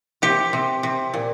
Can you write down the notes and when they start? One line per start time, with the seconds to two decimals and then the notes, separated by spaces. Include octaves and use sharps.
0.22 C3 G4
0.53 C3
0.83 C3
1.14 A#2